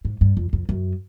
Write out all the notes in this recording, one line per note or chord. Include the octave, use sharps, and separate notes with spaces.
G#2
G2
F2
F2
F#2